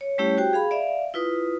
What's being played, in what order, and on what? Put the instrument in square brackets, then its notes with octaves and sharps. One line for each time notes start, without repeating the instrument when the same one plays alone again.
[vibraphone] C#5
G3 A3 C#4 E4 G4 C#5
F#4 G4 C5 G5
G#4 F5 B5
D5 E5 F5
E4 F4 B4 D#6